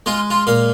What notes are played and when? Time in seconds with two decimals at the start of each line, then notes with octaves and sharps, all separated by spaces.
0.06 G#3 F4
0.30 F4
0.47 A#2 F5